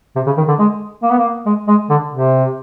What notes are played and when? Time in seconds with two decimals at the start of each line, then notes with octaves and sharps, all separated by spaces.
0.16 C3
0.27 C#3
0.37 D#3
0.48 D3
0.59 G#3
1.03 A#3
1.11 B3
1.19 A#3
1.46 G#3
1.68 G#3
1.90 D3
2.12 C3